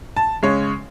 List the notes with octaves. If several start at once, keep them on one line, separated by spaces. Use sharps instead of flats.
A5
C#3 G#3 C#4 C#5